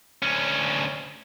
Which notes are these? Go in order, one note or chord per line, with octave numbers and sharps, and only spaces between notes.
D2 C#4